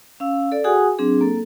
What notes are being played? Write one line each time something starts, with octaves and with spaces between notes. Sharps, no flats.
C#4 F5 E6
A4 D5
F#4 G#4 F#5 G#5 D#6
F#3 C4 D4 G#4
A#3 A4